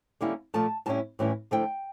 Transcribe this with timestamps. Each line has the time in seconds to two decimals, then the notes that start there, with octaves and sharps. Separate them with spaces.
0.21 D3 G3 A#3 C#4 E4
0.54 A#2 F3 A3 A5
0.86 A2 G3 C#4 E4 A5
1.19 A2 E3 G3 C#4 E4
1.51 D3 F3 A3 E4 G5